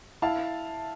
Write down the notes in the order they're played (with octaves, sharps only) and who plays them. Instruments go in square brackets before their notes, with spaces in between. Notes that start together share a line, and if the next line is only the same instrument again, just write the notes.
[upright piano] E4 [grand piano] F5 A5